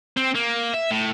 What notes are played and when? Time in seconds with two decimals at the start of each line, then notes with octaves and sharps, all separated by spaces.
0.17 C4
0.36 A#3
0.74 E5
0.91 A2